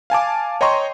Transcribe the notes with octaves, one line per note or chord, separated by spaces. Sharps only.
F5 G#5 A5 D6
C#5 D#5 G5 A#5 C6 C#6